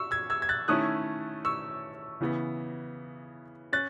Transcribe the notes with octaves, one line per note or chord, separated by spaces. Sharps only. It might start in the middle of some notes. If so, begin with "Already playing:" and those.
Already playing: C#6 E6
E6 G#6
E6 G#6
G#6
F#6 A6
D#3 A3 C#4 E4 D#6 F#6
C#6 E6
C#3 E3 B3
C#4 F#6 A6